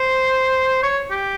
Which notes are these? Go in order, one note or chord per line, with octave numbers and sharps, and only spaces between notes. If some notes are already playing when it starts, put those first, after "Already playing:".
Already playing: C5
C#5
G4